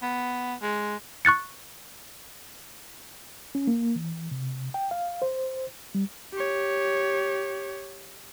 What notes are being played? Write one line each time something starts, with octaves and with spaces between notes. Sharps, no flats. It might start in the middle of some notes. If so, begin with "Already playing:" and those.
B3
G#3
C#6 F#6 A6 C#7
C#4
A#3
E3
C3
G5
F5
C5
G3
G4 C#5